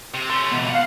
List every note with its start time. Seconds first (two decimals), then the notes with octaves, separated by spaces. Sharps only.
0.14 C3
0.30 A3 C#4 C6
0.51 C#2 B2 E3
0.70 F5 F#5